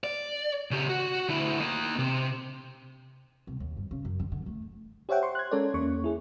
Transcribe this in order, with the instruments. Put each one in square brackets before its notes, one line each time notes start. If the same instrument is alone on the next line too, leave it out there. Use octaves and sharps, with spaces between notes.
[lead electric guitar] D5
C#3 G4
F#4
D2 E4
A#3 D#5
C3
[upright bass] C2
D#2
G2
C#3
F#2
D3
D3
A3
[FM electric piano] G4 C5 C#5 E5 F#5 G5
C5 C6 C#6
F#6 G#6
G#3 C#4 A4 A#4 C#5 D5
E2 A#3 C#4 C#6
E4 G#4